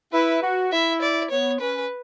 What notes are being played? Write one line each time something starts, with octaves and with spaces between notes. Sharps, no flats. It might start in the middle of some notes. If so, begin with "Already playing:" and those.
E4 B4
F#4
E4 E5
D5
B3 C#5
C#4 B4